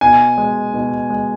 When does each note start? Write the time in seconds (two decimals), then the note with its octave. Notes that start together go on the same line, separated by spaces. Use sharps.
0.01 B2 G#5
0.38 G#3
0.74 B2
1.10 G#3